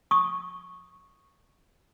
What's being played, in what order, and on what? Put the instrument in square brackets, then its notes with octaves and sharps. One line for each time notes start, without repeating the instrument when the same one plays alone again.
[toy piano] C#6 D#6